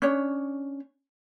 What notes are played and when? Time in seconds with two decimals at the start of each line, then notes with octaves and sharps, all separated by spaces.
0.02 C#4 D4 C#5